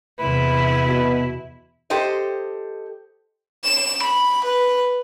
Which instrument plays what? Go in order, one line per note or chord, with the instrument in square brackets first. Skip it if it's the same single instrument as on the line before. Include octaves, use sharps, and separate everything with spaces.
[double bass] E2 C3 [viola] E4 [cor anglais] B4
[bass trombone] B2
[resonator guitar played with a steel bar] G4 A4 C5 D#5
[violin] E7
B5
B4